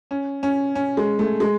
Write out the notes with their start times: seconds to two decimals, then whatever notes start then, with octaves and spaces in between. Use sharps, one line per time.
0.11 C#4
0.43 C#4
0.75 C#4
0.97 G#3
1.19 A3
1.40 G#3